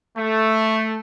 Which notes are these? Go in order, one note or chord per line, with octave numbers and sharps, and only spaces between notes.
A3